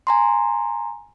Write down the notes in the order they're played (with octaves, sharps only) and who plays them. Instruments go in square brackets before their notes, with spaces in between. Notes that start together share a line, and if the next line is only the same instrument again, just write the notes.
[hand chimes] G#5 A#5 C6